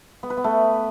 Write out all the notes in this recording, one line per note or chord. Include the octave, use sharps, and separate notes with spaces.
B3
B4
B3
A3